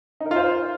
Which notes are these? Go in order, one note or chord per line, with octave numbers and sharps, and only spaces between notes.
D#4
A#4
F4
C5